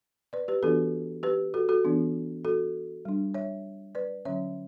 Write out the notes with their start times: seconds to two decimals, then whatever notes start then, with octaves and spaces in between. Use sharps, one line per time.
0.33 B4 D5
0.48 G4 B4
0.63 E3 B3 D4 F#4 A4
1.23 G4 B4
1.54 F#4 A4
1.69 F#4 A4
1.85 E3 B3 D4
2.45 F#4 A4
3.05 G3 D4
3.34 C#5 E5
3.95 B4 D5
4.25 D3 F#3 C#4 C#5 E5